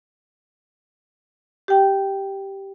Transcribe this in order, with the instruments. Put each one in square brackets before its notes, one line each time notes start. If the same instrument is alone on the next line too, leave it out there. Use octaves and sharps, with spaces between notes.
[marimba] G4 G5